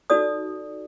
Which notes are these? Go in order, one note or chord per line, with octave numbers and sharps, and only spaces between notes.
D#4 F#4 A4 D5 D#6